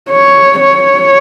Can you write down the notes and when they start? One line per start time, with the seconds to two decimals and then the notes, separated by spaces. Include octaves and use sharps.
0.09 C#5
0.60 C#5